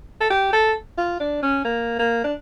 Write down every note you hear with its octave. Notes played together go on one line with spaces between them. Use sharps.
A4
G4
A4
F4
D4
C#4
A#3
A#3
D4